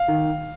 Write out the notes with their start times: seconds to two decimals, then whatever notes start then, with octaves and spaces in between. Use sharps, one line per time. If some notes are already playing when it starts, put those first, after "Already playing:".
Already playing: F5
0.08 D#3